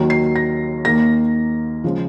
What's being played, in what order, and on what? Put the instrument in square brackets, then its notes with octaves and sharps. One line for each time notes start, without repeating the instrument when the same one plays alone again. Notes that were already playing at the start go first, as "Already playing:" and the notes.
Already playing: [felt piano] D#2 D#3 F#3
C7
A#6
D#2 D#3 A#3 A#6
C#3 F3 G#3